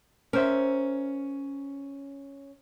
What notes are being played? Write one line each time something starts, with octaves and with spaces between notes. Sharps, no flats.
C#4 A#4 C5 E5